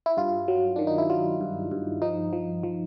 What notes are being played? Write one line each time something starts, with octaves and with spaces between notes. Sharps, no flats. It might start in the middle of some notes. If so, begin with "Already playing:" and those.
E4
G2 F4
F#3
D#3 D4
D#4
E4
F#3 F4
G2
G2
F3 D#4
F3
F3